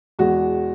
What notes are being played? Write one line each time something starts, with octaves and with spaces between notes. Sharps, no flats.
E2 B2 G#3 F#4